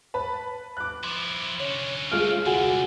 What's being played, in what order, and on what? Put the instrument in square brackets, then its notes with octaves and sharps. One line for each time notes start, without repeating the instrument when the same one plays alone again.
[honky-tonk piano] B4 A5 B5
D6 F#6
[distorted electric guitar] F3 E4 [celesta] C6
[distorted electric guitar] D3 C#4 [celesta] C#5
[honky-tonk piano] G#3 A3 F4 [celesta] F6 D7
[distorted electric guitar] C2 D3 [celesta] F#4 F#5 G#5